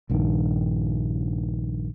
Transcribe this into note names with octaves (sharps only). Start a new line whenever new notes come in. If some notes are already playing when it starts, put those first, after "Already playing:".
A#1 G2 D#3